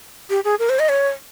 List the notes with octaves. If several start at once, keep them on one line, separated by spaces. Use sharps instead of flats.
G4
G#4
A#4
C5
D#5
C#5